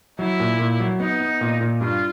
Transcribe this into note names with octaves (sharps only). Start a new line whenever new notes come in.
F#3 E4
A#2
A#2
F#3
B3 D#4
B3
A#2
A#2
G2 F4